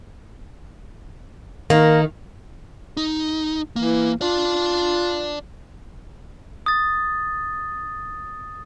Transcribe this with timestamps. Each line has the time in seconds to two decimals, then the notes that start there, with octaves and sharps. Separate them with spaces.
1.70 D#3 A#3
2.97 D#4
3.76 E3 A#3
4.21 F4 D5 A5
6.66 D#6 A6